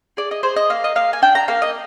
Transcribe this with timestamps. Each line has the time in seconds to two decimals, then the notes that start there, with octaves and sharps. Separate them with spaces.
0.17 G#4 D5
0.31 D#5
0.43 G#4 C5
0.56 D#5
0.70 A#3 F5
0.84 D#5
0.95 A#3 F5
1.13 G#5
1.22 D4 G5
1.35 A#5
1.48 A#3 F5
1.62 D#5